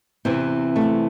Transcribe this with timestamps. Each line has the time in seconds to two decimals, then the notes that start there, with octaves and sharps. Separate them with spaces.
0.25 E2 C3 E3 C4
0.76 A3